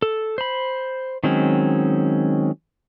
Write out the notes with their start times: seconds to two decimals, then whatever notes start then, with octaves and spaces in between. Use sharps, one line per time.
0.02 A4
0.38 C5 B5
1.24 D#3 F#3 G#3 C4 C#4